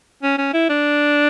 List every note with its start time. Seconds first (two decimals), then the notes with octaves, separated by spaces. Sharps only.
0.23 C#4
0.38 C#4
0.53 E4
0.69 D4